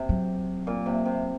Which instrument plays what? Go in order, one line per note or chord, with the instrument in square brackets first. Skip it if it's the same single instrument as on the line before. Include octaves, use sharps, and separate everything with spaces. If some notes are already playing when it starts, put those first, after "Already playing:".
Already playing: [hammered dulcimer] C3
[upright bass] F#3
[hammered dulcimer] A#2
C3
C3